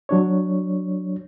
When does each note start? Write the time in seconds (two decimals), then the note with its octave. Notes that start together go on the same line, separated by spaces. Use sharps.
0.09 F#3 D4 C#5